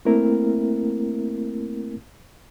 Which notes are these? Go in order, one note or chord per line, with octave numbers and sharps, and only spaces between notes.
A3 A#3 C4 E4 A#4